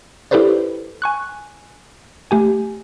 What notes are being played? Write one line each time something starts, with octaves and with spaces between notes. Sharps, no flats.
E4 G4 A4 B4 C5 D5
G#5 C#6 F#6
A3 G4 G#5